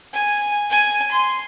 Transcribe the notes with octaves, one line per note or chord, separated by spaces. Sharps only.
G#5
G#5
C6